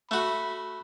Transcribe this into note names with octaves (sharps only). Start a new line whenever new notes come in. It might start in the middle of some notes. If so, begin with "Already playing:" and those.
A3 F#4 B5